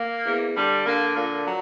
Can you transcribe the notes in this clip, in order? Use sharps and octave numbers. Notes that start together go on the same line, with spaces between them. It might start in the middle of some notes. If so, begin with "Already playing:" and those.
Already playing: A#3
E2
D3 G3
D3 A#3
A#2 A#3
F#3